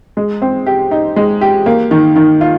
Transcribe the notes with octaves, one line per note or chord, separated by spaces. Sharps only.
G#3
C4
G4
D#4
G#3
G4
A#3
D#3
D#3
F4